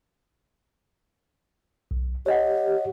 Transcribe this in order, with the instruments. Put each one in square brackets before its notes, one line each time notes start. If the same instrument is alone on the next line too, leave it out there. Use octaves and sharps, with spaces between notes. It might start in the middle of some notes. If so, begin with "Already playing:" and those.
[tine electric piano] B1
[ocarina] G4 [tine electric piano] C#5 D#5 F#5